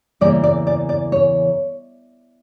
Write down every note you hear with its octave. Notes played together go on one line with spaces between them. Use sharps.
E2 C#3 E3 G3 A#3 D5
D5
D5
D5
C#5